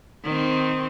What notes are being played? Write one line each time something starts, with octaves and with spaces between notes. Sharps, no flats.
D#3 C4